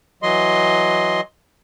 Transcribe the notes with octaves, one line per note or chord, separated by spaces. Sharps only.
E3 F#3 D#5 C6